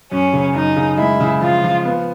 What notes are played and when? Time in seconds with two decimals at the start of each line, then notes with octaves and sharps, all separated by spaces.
0.12 F#2 C#4
0.33 C#3
0.54 F#2 D#4
0.76 C#3
0.97 G#3 E4
1.20 C#3
1.41 F3 F4
1.64 F3
1.85 B3